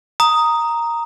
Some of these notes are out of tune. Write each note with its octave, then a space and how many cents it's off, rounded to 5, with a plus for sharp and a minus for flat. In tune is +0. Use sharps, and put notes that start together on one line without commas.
A#5 +0 D#6 +0